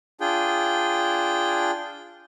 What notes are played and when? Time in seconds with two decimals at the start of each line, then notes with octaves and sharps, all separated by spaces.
0.21 D4 F4 G#4 G5